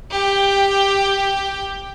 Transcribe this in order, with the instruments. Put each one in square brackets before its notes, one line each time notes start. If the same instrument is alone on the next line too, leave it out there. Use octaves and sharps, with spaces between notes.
[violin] G4 G5